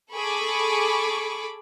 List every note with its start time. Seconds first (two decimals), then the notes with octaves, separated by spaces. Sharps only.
0.12 G#4 A4 B5 C#6 D6